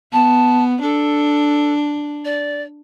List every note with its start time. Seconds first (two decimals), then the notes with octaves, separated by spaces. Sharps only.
0.12 B3 A5
0.82 D4 A4
2.25 D5